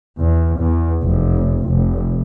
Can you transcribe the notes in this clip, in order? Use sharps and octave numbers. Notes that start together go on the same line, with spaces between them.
E2
E2
F1
F1